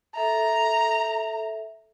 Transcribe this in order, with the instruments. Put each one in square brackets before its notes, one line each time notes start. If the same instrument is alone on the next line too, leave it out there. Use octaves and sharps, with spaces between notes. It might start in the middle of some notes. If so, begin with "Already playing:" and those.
[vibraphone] A4 E5 [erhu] A#5